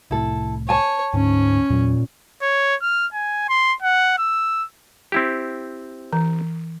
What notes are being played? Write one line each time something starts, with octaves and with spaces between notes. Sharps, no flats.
C2 A2 E4 A4
C#5 G#5 A5
D2 G#2 C#4
E2 A#2 F#3
C#5
F6
G#5
C6
F#5
E6
C4 E4 G4
E3